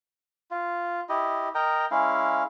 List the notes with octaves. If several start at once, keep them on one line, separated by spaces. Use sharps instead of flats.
F4
E4 G4 D#5
A#4 D#5 G5 A#5
G#3 C#4 E4 F5